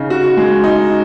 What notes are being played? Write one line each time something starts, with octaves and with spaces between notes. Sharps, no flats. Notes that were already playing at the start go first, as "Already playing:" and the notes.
Already playing: C#3 D#4
F#4
G#3
D#4